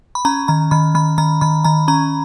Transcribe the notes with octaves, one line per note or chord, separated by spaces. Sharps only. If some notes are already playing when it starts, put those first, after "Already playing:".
B5
C#4 A#5
D#3 A#5
D#3 B5
D#3 B5
D#3 A#5
D#3 B5
D#3 A#5
C#4 A#5